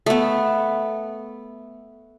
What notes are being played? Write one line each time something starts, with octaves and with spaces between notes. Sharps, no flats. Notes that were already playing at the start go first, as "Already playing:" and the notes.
A3 B3